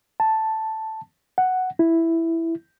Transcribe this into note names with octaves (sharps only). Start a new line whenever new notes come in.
A5
F#5
E4